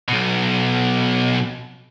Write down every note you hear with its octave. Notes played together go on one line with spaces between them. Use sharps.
B1 B2